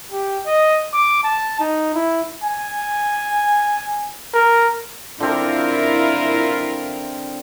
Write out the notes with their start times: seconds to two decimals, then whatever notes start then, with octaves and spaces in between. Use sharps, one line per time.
0.12 G4
0.46 D#5
0.93 D6
1.24 A5
1.60 D#4
1.95 E4
2.43 G#5
4.34 A#4
5.20 D3 C4 E4 F4 A#4